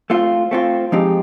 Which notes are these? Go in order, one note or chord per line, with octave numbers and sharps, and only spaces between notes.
A3 C4 F4
A3 C4 F4
F3 G#3 C4 D#4 G4